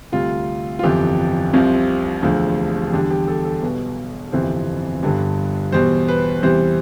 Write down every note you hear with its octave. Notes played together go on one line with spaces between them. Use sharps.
D2 C3 G3 F4
F4
G1 F2 E3 G4
C2 C3 F3
E1 D2 D3 F3
E2 D3 G3 G4
G4
A4
A4
B1 B2 G3 B4
G1 F2 C3 E3 C5
G1 G2 D3 G3
E2 B2 G3 C5
B4
E2 C3 E3 G3 C5